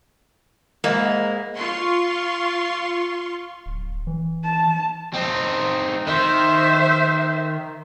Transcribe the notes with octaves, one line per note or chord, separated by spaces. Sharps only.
G#2 G#3 A#3 E4
F4 C6 C#6
D1
E3
A5
C4 D#4
D#3 C5 E5